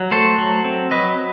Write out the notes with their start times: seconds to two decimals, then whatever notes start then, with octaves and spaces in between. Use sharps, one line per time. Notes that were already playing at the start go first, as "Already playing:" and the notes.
Already playing: F#3
0.11 A3 A4 C5
0.38 F#3
0.64 C4
0.91 F#3 B4 D#5